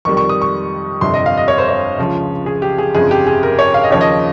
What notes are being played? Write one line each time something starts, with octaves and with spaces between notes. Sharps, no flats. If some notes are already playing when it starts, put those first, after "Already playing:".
F2 D#3 G3 C#6
C#6
D#6
C#6
G1 F2 C3 G3 C6
D#5
F5
D#5
C#5
C5
C#5
C#2 C#3 F3
G#4
G4
G#4
G1 F2 C#3 F3 G#4
G4
G#4
A#4
C#5
F5
D#5
D#2 C#3 F3 C#5
D#5